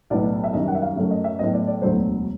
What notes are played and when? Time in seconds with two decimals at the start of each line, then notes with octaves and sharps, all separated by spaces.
0.10 B1 A2 F#3 B3 D5
0.44 E5
0.53 F#2 D#3 G3 D#5
0.68 F#5
0.75 E5
0.82 F5
0.96 F#2 C#3 F#3 A3 C#4
1.11 D#5
1.24 E5
1.39 A2 F#3 B3 D#5
1.53 D5
1.67 D5
1.82 E1 D2 D3 F#3 A3 C5